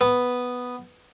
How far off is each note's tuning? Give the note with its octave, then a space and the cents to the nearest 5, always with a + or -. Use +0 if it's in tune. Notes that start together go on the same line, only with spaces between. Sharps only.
B3 +0